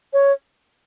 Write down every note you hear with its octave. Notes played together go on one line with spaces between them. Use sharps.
C#5